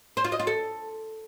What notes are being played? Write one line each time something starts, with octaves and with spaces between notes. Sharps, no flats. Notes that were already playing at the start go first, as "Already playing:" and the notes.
C5
F4
D#5
F4
A4